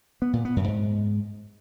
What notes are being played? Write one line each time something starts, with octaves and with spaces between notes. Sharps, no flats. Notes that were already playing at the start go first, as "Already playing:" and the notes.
B3
A#2
B3
F#2
G#2